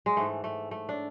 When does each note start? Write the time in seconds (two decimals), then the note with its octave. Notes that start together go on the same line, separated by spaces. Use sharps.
0.06 G#3
0.17 G#2 E3 A3
0.44 A3
0.71 A3
0.89 D4